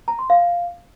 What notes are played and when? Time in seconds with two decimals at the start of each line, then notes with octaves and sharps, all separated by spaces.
0.08 A#5
0.19 C6
0.30 F5